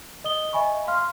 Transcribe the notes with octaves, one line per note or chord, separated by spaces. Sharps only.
D#5 D#6 G7
D#5 E5 G#5 B5 C#6
F5 C6 F6